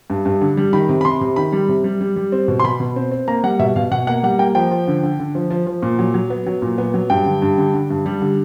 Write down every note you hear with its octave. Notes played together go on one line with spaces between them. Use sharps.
G2
G2
D3
G3
D#3 B5
C3
B5
C3 C6
C3
D#3 B5
G3
C3
G3
G3
G3
C4
B2
C6
B2 B5
B2
C4
C4
A#3 A#5
G3 F#5
B2 E5
B2 F5
B2 F#5
A#3 F#5
G3 F#5
A#3 G5
F3 G5
F3
D3
D3
D3
F3
F3
F3
A#2
F#3
F#3
B3
F#3
A#2
B3
F#3
G2 G5
D3
G2
D3
D3
G2
G3
D3